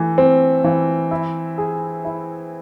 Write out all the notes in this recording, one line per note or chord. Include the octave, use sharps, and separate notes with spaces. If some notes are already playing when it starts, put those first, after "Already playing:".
Already playing: E3 A3
C4
E3
E4
G#4
E4